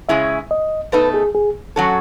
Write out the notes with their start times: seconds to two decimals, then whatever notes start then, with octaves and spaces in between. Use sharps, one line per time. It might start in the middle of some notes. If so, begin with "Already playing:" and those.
0.09 C#3 G#3 C#4 E4 G#4 E5
0.51 D#5
0.92 B2 A3 D#4 A4 B4
1.14 G#4
1.35 G#4
1.76 F#3 C#4 F#4 A4